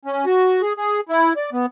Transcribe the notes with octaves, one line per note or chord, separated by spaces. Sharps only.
C#4
F#4
G#4
G#4
E4
D5
B3